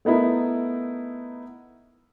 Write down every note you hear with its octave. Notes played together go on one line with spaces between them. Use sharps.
A3 B3 D#4 E4 A#4